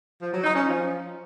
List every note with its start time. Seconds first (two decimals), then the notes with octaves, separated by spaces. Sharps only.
0.21 F3
0.33 F#3
0.44 D#4
0.56 C#4
0.67 F3